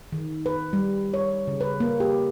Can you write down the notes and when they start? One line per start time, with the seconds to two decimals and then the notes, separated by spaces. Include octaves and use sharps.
0.12 D#3
0.46 B4
0.73 G3
1.14 C#5
1.47 C#3
1.61 B4
1.80 A#3
2.00 G4